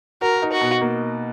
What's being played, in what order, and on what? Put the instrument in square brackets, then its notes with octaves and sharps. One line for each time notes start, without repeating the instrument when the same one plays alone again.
[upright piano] F#4 [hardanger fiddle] A#4
[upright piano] D#4
[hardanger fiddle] F#4
[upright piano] B2
A#3